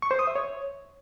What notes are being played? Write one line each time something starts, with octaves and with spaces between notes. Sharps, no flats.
C#6
C5
D#6
E5
C#5